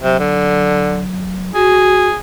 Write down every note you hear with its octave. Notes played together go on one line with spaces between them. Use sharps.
C3 F#3
D3
F#4 G#4